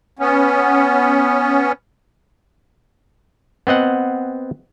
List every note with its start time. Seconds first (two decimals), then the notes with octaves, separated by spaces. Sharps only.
0.19 B3 C#4
3.67 B3 C4 D#5 F#5